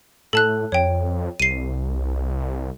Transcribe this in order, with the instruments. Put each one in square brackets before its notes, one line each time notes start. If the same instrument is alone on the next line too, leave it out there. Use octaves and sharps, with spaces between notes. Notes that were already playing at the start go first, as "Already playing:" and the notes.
[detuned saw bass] A2 [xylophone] A4 A5 F#6
[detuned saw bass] F2 [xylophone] C#5 G5
[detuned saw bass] C2 [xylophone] C7 D#7